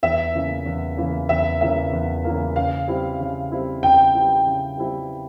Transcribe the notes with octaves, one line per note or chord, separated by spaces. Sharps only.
E2 E5
C#3 E3 A#3
E2
C#3 E3 A#3
E2 E5
C#3 E3 A#3 E5
E2
C#3 E3 A#3
C#3 F5
G3 C4 E4
C#3
G3 C4 E4
C#3 G5
G3 C4 E4
C#3
G3 C4 E4